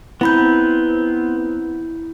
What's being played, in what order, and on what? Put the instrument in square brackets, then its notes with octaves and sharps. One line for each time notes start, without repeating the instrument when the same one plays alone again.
[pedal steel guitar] B3 C4 [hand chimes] E4 B5 G6